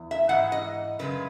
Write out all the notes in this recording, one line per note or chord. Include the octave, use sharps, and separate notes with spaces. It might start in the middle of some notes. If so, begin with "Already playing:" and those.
Already playing: E2
E5
G#2 E3 F#5
D#5
F#2 C#3 G#3 B4